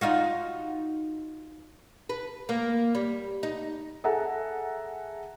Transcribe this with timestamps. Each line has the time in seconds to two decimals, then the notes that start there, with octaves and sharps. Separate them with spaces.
0.01 D#4 F4 F#4
2.09 B4
2.49 A#3
2.95 G3
3.43 D#4
4.04 G#4 A4 E5 F#5 G#5 A#5